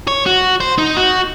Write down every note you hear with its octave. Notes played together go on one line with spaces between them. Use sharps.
C#5
F#4
C5
D#4
F#4